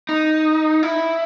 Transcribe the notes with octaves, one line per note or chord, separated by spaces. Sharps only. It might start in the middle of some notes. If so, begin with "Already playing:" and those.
D#4
E4